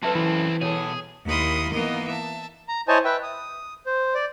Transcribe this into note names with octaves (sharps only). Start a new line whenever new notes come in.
F#2 C4 C#4 E4 A4 B4 E5 A5
E3 B5
B2 G#4 A4 C#5
D#2 E4 A#4 B5 C6 D#6
E3 A#3 B3 D#4 A#4 D#5
E5 A5
A#5
E4 C5 C#5 D#5 G#5 A5
B4 E5 G5
D#6
C5
D5